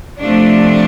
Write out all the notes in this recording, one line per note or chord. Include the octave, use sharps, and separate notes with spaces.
C3 F3 A3 D4